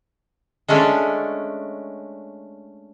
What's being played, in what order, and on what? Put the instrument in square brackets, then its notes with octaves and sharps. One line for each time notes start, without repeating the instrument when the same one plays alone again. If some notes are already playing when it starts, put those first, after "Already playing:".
[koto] G#3 A3 C#4 D4